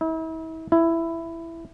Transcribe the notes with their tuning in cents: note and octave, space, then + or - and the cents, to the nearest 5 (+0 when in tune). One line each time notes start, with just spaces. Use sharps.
E4 -40
E4 +10